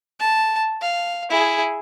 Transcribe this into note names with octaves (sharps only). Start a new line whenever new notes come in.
A5
F5
E4 G#4